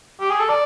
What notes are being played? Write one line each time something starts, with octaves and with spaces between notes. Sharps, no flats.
G4
G#4
A4
D5